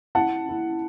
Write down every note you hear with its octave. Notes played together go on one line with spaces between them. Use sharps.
E4 F#5 A5
E4